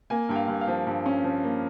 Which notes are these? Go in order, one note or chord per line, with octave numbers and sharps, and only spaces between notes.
A#3 G#5
G2 G5
F5
G2
F5
F3
G2
C#4
F3
A#3